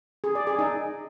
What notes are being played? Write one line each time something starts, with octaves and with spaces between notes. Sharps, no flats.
G#4
D5
G#4
D#4